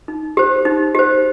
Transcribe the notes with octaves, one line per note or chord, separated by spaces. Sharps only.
D#4
G4 C5
D#4
G4 C5